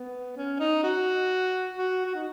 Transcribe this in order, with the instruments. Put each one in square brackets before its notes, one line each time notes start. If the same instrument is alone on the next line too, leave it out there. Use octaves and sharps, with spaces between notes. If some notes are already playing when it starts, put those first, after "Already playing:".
Already playing: [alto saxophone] B3
C#4
D#4
F#4
F#4
F#4
D#4